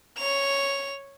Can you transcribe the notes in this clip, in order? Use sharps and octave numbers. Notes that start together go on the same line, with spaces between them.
C#5 F7